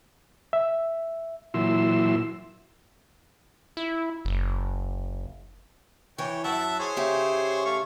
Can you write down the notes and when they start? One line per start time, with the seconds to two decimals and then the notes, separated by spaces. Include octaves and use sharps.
0.53 E5
1.54 A#2 E3 F#3 E4 C6 E6
3.77 E4
4.25 F#1
6.18 E3 C#5 G5
6.44 F#2 E5 F#5 A5
6.79 G#4 C5 C#5
6.97 C#3 G4 E5
7.65 A3 F5 C#6